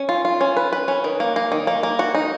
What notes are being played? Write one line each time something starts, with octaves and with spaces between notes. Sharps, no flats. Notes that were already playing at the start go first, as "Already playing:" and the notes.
Already playing: C#4
F4
F4
C#4
B4
B4
C#4
D#3
A#3
A#3
D#3
A#3
A#3
F#4
D#4